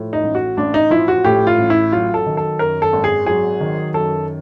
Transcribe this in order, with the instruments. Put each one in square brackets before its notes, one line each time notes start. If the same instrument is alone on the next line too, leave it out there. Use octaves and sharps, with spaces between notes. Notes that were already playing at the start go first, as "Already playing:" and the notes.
Already playing: [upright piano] A2 F3
D#4
A1
F#4
A1 D4
D#4
F3 E4
F#4
A2 G4
F4
A1
E4
F#3 F4
A4
D#3
A4
F#2 A#4
A4
G#1
G#4
F#3 G#4
D#3
F#2 A4